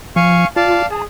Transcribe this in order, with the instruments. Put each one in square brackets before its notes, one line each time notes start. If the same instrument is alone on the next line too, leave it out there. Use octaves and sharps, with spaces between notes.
[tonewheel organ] F3 [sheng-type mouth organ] F5 G#5 C#6
[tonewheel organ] F4 [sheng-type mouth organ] D5 F5 A5
[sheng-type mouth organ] G#4 [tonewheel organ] A5